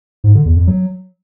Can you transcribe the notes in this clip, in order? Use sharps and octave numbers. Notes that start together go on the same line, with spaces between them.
G#2
D3
E2
F2
F#3